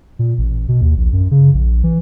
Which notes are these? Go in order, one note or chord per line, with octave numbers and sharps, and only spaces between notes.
A#2
A1
B2
D#2
A#1
F#2
C#3
A#1
E3